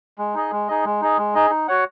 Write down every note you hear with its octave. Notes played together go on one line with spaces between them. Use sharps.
G#3
D#4 G#4 D#5
G#3
D#4 G#4 D#5
G#3
D#4 G#4 D#5
G#3
D#4 G#4 D#5
D#4
F#4 C#5 F#5